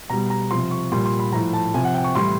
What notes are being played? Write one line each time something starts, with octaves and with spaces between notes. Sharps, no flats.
B2 G3 A#5
A#5
C3 F3 C6
C#6
A#2 G3 C6
C6
B5
A2 F3 A#5
A5
C3 F3 G#5
F#5
G5
C#6
A2 E3 G3 C6